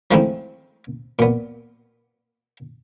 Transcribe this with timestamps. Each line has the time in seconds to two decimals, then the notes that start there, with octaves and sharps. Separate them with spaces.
0.11 F3 G#3 A3 C4 D#4 E4
1.19 A#2 B3